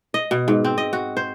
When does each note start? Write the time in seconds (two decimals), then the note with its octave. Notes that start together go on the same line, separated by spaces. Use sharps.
0.14 D#5
0.31 B2
0.48 G#2
0.64 C4
0.78 D#5
0.93 F#4
1.17 C5